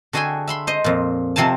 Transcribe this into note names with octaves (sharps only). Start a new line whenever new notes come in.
D3 F#4 G#4 E5 G5 G#5
E5 B5 C6
C5 D#5
F2 A#2
F2 C3 F3 C4 G#5 A5